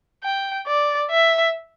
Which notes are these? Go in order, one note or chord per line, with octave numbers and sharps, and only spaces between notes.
G5
D5
E5